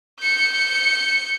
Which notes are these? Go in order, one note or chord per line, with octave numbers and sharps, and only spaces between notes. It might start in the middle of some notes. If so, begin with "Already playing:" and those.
G6 C#7